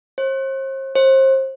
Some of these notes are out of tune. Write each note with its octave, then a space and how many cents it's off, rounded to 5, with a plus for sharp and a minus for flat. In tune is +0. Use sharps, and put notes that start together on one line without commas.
C5 +40
C5 +30